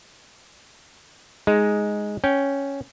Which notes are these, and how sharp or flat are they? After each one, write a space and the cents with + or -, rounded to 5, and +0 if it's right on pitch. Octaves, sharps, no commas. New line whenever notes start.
G#3 +0 D#4 +0
C#4 +0 G5 -5